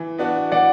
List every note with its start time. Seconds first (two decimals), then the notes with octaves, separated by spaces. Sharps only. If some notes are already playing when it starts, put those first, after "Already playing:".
Already playing: E3
0.18 B3 D4 F#4
0.52 E3 D5 F#5